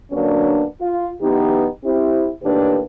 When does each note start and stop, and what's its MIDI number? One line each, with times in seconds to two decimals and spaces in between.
0.12 0.64 50
0.12 0.64 54
0.12 0.64 58
0.12 0.64 59
0.12 0.64 61
0.12 0.64 62
0.81 1.10 65
1.22 1.68 42
1.22 1.68 52
1.22 1.68 59
1.22 1.68 63
1.22 1.68 67
1.84 2.29 60
1.84 2.29 64
1.84 2.29 67
2.43 2.81 45
2.43 2.81 51
2.43 2.81 58
2.43 2.81 62
2.43 2.81 67
2.43 2.81 71